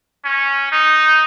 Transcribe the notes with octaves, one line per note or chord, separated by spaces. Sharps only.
C#4
D#4